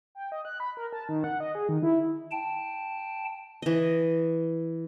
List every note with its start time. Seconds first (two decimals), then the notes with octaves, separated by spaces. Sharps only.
0.15 G5
0.32 D#5
0.45 F#6
0.60 B5
0.77 A#4
0.93 A5
1.09 D#3
1.24 F#5
1.40 D#5
1.55 G#4
1.69 D#3
1.83 E4
2.31 G5 A5
3.62 E3 D#5